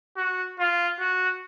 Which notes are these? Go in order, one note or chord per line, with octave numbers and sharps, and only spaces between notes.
F#4
F4
F#4